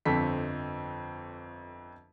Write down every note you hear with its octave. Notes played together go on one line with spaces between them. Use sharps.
G1 F2 C4 A4 B6